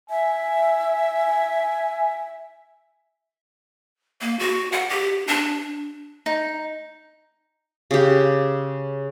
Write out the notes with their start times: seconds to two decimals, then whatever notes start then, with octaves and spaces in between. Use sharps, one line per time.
0.10 E5 G#5
4.21 A#3
4.39 F#4
4.72 F#5
4.90 G4
5.27 D4
6.26 D#4
7.91 C#3 G4